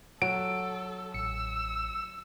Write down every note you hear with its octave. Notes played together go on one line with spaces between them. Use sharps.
F#3 A4 D7
A1 E6 C#7